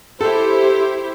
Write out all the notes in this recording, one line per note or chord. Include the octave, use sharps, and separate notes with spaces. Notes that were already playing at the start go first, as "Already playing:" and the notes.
E4 G4 A4 C5